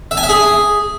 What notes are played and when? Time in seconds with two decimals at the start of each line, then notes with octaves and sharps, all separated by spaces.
0.11 E5
0.17 G#5
0.23 E5
0.29 G#4